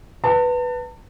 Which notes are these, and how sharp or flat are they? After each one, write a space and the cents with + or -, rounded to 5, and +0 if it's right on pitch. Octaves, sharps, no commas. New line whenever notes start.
B4 +0 A5 +40